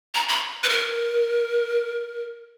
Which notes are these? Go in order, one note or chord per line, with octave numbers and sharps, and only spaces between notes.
A#5
B5
B4
A#4